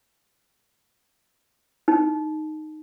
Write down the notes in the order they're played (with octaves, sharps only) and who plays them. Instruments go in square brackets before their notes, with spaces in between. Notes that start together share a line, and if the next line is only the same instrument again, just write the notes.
[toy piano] D#4